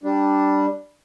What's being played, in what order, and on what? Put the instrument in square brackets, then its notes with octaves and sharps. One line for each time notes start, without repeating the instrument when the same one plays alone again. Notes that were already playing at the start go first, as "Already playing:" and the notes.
[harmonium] G3 D4